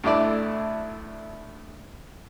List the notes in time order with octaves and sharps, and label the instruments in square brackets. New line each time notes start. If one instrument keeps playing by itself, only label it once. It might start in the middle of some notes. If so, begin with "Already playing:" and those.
[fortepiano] D2 A2 D4 E4 D5